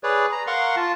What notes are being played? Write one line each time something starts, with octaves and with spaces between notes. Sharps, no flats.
G#4 B4 C#5 D5
A#5
A#4 F5 F#5 C6 C#6
F4 A5